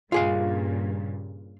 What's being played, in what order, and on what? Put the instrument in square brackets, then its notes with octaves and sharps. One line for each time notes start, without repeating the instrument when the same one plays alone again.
[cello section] G2 A#2 C#3 [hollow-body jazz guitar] F4 G#4 F5